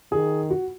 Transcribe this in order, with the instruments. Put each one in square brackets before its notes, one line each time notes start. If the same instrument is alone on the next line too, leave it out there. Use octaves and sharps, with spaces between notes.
[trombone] D#3 [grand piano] G#4
[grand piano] F#4